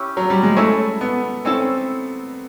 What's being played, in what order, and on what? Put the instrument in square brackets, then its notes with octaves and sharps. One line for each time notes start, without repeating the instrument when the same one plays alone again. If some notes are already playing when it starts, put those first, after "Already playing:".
Already playing: [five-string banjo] C#4 E4 G4
[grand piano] F#3
G3
G#3
[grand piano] A3 [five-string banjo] C#4 E4 A4 C#5
[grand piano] B3
[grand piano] C4 [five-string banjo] C#4 E4 A4 C#5